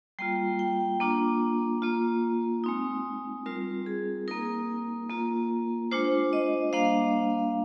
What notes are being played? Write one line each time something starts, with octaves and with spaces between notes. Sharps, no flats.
G3 A#3 F4 G5
G5
A#3 D4 F4
A#3 F4
G#3 C4 D#4
G3 C4 F4 A#4
G#4
A#3 D#4 A#4
A#3 F4
G#3 D4 F4 C5
D#5
G3 A#3 D4 F5